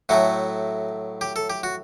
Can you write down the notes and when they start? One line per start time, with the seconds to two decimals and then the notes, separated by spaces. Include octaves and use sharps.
0.09 A2 F#3 A3 F#4
1.21 G4
1.36 A4
1.50 G4
1.63 F#4